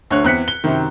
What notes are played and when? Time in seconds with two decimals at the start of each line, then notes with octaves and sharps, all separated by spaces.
0.11 D2 D3 C#5 F#6
0.24 E2 C4 F#6 B6 C#7
0.48 G7
0.64 F#2 C3 D#3